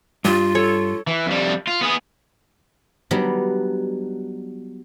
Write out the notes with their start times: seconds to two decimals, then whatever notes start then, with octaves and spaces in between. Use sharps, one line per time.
0.25 G2 F4
0.55 A4 C#5
1.07 E3
1.26 F2 G3
1.68 F4
1.81 B3 G#4
3.11 F#3 G3 B3 D4 D#4